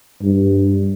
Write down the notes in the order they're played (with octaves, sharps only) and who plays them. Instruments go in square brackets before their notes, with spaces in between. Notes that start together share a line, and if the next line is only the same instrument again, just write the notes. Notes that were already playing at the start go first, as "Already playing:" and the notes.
[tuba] G2